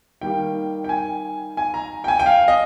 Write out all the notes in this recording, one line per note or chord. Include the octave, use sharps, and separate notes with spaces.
D#3 G3 A#3 G5
G5
G#5
G#5
A#5
G5
G#5
G5
F5
D#5